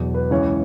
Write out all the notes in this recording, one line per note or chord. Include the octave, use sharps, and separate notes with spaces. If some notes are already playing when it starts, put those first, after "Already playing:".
Already playing: E2 B2 F#3
B4
C#2 C#3 E3 C#5